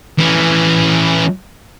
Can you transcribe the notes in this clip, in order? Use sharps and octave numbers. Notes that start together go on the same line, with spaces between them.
E3 C#4